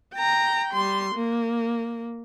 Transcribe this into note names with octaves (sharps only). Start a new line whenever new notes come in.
G5 A#5
G3 C6
A#3